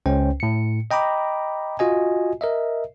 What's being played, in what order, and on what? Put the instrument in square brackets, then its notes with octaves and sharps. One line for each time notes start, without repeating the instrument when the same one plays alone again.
[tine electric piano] C#2 C#4 C5 G5
A2 C#7
D#5 G5 A#5 B5 D6
F4 F#4 D#5 G#5
A#4 D#5 E5